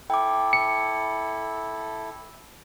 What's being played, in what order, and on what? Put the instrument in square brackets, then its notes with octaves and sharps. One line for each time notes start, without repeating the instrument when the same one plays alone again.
[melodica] E4 A4 [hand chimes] G5 D6
[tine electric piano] C#7